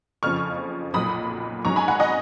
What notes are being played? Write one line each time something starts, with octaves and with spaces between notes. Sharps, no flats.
F#1 F2 C#3 F3 C#6 F6
B1 A#2 F#3 B5 D#6
G#2 F#3 C#4 A#5 C#6
G#5 B5
F#5 A#5
D#5 F#5